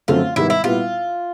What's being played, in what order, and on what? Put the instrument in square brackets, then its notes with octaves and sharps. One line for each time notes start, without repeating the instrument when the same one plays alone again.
[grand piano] F#2 D3 F3 A3 C4 [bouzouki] F4
[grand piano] G#2 D#3 G3 B3 [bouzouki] E4
[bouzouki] E4
[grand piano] A#2 G3 B3 E4 [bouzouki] F4